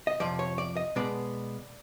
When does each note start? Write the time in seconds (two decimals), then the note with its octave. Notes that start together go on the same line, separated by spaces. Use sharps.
0.07 D#5
0.20 F2 C3 F3 D5
0.39 C#5
0.58 D5
0.77 D#5
0.96 B2 G#3 B3 D5